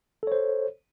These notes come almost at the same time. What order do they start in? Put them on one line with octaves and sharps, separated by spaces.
A4 C#5 C5